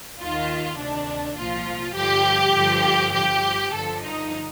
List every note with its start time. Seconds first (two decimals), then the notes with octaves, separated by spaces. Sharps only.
0.19 D#2 D#3 F4
0.77 D2 C3 D#3 D4
1.37 C2 A#2 F3 F4
1.95 G2 D3 F3 G4
2.54 G2 D3 F3
3.13 G2 F3 G4
3.72 G2 D3 F3 A4
4.02 D#4